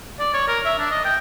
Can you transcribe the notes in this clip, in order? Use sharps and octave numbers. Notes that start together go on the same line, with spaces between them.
D5
C#5
A#4
E5
D4
D#5
G5